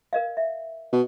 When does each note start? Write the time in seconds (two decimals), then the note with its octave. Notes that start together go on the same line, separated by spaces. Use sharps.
0.13 A#4 D#5 F5
0.37 E5
0.93 B2